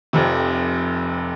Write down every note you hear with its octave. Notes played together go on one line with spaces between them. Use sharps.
F1 F2 C3